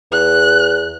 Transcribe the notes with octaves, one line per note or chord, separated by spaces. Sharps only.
E2 F#6